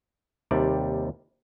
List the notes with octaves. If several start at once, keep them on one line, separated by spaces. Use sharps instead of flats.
D#2 C3 G3 D5